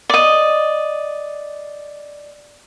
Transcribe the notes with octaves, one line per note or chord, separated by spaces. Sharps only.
D5 D#5